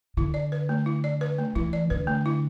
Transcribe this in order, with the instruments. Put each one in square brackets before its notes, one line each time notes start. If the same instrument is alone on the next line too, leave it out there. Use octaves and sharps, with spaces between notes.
[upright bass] D3 [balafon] E4
[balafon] D5
B4
A3
E4
D5
B4
A3
[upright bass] E3 [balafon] E4
[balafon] D5
[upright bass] D3 [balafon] B4
[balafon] A3
E4